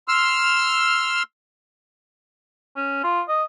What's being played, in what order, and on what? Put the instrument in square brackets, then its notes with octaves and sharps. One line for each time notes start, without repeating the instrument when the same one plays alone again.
[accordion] C6 E6 F6
[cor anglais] C#4
F4
D#5